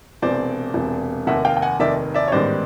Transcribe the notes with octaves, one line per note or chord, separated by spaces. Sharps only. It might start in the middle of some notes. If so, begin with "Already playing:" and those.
E1 E2 C3 C5 D5
E1 E2 C3
F1 D#2 D#3 E5 F#5
F5 G5
G5
F#5 G#5
F1 D#2 D#3 D5 E5
D5 E5
C#5
A1 G#2 D#3 G3 B3 C5 D5